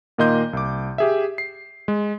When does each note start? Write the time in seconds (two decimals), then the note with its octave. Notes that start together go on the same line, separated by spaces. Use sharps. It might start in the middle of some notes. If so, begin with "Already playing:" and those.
0.18 A#2 D#3 A#3 D#5 C6 G6
0.53 C2 D6
0.98 G4 G#4 E5
1.38 C7
1.88 G#3